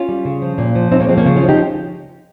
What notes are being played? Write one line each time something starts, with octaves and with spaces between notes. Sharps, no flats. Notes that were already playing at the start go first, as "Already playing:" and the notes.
Already playing: C#4 F4
G3
C#3
F3
A#2
F3
A#2 C4 D#4
A#3 C#4
F3 G#3 C4
A#3 C#4
C#3
C#4 F4
F3
D#4 G4